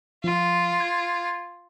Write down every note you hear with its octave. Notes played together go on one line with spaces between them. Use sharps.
F3 F4
G#6